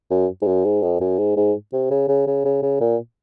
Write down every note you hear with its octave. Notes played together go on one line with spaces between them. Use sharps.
F#2
G#2
F#2
G#2
F2
F#2
G#2
G#2
C3
C#3
C#3
C#3
C#3
C#3
A#2